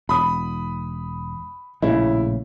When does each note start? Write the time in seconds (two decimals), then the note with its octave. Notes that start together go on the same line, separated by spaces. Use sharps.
0.09 E1 B5 D#6
1.82 A#1 A2 C#3 E4